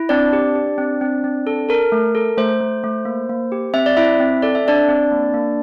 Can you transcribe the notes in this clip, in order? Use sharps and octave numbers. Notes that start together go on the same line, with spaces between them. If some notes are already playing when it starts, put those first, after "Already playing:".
Already playing: E4
C4 D4 D5
G4
G4
C4
C4
C4
A4
A4 A#4
A3
A4
A3 C5
A3
A3
A#3
A#3
G4
C4 E5
D5
C4 E4 E5
C4
A4 D5
E5
C4 D4 D5
C4
A#3
A#3